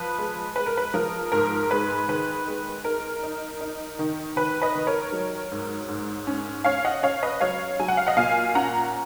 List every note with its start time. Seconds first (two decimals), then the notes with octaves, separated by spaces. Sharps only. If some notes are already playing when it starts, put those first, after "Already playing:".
Already playing: F3 B4
0.18 G#3
0.56 G#3 B4
0.66 A#4
0.77 B4
0.94 F3 A#4
1.32 G#2 A#4
1.70 G#3 B4
2.08 D#3 B4
2.47 G#3
2.84 D#4 A#4
3.23 D#4
3.61 D#4
3.99 D#3
4.36 D#3 B4
4.62 B4 D#5
4.75 D#3
4.87 A#4 C#5
5.12 F#3
5.52 G#2
5.88 G#2
6.27 C#4
6.64 C#4 C#5 F5
6.85 D#5 F#5
7.03 C#4 C#5 F5
7.23 B4 D#5
7.41 F#3 C#5 F5
7.79 F#3 G#5
7.88 F#5
7.97 F5
8.07 D#5 F#5
8.17 A#2 F5 G#5
8.55 C#4 F#5 A#5